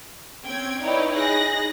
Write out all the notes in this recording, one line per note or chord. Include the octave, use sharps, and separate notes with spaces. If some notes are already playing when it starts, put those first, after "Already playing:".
C4 C#4 G5 G#6
D#4 E4 B4 C#5 D5 G5
D#4 G#4 F#6 A#6